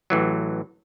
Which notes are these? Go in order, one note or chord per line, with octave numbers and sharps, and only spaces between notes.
A1 E3 F#3